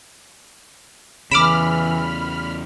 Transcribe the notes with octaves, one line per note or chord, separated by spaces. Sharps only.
E2 C#3 E3 B5 D6 F6 D7 E7